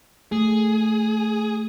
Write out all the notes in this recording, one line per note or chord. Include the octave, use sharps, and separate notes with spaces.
A3 G#4